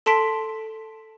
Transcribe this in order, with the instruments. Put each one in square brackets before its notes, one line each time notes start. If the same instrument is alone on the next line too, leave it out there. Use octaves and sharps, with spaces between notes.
[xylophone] A4 A5 C6 B6 D7